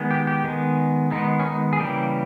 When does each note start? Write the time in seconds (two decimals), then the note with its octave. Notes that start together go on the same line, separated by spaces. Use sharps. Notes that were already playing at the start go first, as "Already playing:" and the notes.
Already playing: D#3 G#3 B3
0.11 G4
0.27 G4
0.44 D#3 G#3 B3
1.11 D#3 G#3 B3 D#4
1.40 C#4
1.46 D#4
1.73 G#4
1.79 C#3 E3 G3 A#3 G4